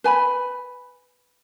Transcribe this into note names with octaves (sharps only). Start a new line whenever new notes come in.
B4 G#5 A#5 B5